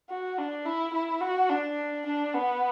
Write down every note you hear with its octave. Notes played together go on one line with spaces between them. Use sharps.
F#4
D4
E4
E4
F#4
D4
D4
B3